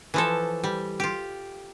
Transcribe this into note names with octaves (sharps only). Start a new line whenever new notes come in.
E3 F3 A4
G3
F4 G4